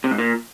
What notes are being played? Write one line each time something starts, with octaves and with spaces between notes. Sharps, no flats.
C3
G#2
A#2